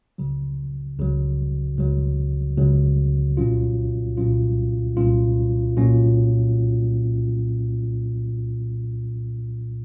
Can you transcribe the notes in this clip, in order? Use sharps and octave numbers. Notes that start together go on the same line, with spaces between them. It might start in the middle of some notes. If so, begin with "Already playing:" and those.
C#2 C#3 F#3
C#2 C#3 F#3
C#2 C#3 F#3
C#2 C#3 F#3
C2 A#2 F#3 C#4 F4
C2 A#2 F#3 C#4 F4
C2 A#2 F#3 C#4 F4
A#2 F#3 C#4 F4